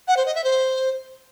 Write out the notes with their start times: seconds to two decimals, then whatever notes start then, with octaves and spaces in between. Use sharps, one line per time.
0.08 F#5
0.17 C5
0.26 D#5
0.35 E5
0.44 C5